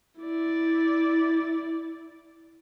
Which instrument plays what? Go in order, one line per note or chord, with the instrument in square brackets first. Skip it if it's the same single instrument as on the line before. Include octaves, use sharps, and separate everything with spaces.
[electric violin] E4 D5